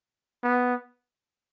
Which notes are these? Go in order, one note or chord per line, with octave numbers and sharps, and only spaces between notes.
B3